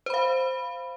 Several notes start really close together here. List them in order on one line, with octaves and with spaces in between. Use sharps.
C5 B5 F5